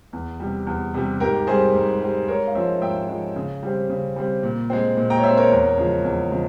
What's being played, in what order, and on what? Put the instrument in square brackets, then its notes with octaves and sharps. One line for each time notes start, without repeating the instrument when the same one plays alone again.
[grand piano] E2
C3 G3
E2
C3 G3
G#2 G4 A#4
G3 C4 G#4 C5
G#2
G3 C4
G#2 A#4 C#5
F5
F3 G#3 C#4 C5 E5
G#2 E5 G5
F3 G#3 C#4
C#3
G3 C4
C#3
G3 C4
A#2
G#3 C4
A#2
G5 A#5
C#5
G#3 C4 C5 E5
A#4 C#5
E2
C#3 F3 G#3
E2
C#3 F3 G#3